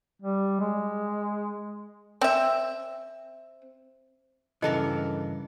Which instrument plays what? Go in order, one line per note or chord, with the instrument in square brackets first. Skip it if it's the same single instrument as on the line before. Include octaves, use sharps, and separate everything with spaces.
[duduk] G3
G#3
[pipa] C4 E5
[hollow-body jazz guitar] G2 E3 [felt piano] C#3 C#7 [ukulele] D4 A4 A#4 [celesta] D#5